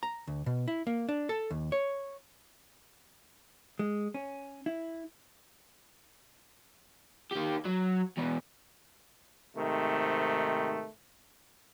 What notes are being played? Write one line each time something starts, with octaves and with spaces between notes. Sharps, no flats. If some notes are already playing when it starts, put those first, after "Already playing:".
A#5
D2
B2
E4
A#3
D4
A4
D#2
C#5
G#3
C#4
E4
D#3 G4
F#3
E2 B2
G#2 C3 D#3 A3